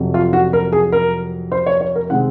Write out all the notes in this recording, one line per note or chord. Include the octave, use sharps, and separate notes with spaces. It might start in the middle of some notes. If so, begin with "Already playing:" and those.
Already playing: F2 C3 F#3
F4
F#4
A#4
G#4
A#4
C5
C#5
C#5
A#4
C3 D#3 G#3 C4 F#5